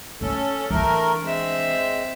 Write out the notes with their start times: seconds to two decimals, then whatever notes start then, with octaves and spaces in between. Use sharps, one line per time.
0.21 A3 C#4 A4
0.71 E3 A3 D4 A#4
1.22 G#3 C4 E5